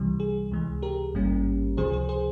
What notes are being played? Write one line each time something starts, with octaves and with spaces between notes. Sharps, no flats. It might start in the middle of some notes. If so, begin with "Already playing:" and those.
Already playing: C2 C3 E3 G3
G#4
C#2 C3 E3 G#3
G4 A#4
G#1 G2 G3 A#3 C#4
C#2 C3 F3 G#4 C5
G#4
G#4 C5